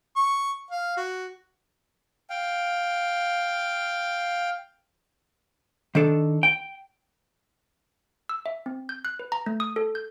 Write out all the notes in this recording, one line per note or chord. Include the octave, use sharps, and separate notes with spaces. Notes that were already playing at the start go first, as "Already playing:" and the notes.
C#6
F5
F#4
F5 G5
D#3 D4 A4
G5
E6
E5
C4
G6
F#6
B4
A#5
A3
D#6
A4
G6